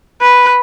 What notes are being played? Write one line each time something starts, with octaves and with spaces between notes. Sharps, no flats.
B4